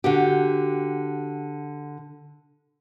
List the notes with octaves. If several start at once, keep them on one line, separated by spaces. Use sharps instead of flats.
D3 F#4 G4